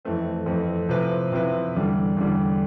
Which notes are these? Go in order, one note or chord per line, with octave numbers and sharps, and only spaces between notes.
F2 E3 A3 C4
F2 E3 A3 C4
C3 F3 C4 E4 B4
C3 F3 C4 E4 B4
E2 D3 G3
E2 D3 G3